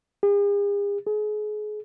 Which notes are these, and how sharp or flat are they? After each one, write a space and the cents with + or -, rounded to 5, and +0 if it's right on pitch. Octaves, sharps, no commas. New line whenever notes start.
G#4 -45
G#4 +30